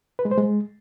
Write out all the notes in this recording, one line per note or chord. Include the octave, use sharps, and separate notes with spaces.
B4
G#3
C5
G#3